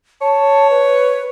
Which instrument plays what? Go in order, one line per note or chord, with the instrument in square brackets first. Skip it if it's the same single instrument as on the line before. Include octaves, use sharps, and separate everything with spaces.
[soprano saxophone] C#5 [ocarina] A5
[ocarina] B4